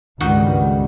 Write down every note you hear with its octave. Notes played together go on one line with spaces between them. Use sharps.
C#2 G2 D#3 G3 F#4 D#5